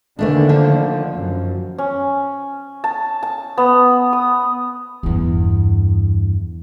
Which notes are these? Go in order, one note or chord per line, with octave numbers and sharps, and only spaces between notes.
E2 D3 D#3 A3 A#3 D4
F3
F#2
C#4
A5
A5
B3
D#6
E2 G2